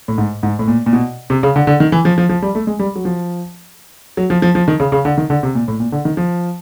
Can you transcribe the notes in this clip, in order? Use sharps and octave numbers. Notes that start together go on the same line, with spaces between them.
A2
G#2
G#2
A2
A#2
A#2
B2
C3
C#3
D3
D3
D#3
E3
F3
F3
F3
G3
A3
G#3
G3
F#3
F3
F#3
F3
F3
F3
D#3
C#3
C#3
D3
D#3
D3
C3
A#2
A2
A#2
D3
D#3
F3